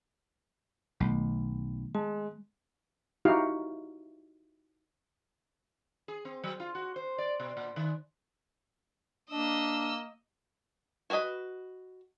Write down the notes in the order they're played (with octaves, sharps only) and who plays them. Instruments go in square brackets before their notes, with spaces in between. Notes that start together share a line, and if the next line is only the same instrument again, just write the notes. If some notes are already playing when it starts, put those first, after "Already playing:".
[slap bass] B1 [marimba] D#3 A3 B3
[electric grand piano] G#3 [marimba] A5
[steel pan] D#4 E4 F#4 G4 F5
[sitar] G#4
C4
F#3
F4
F#4
C5
D5
B2
A#2
D#3
[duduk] A#3 [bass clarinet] D4 [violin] D#5 E6
[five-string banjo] F#4 A#4 B4 D#5 B5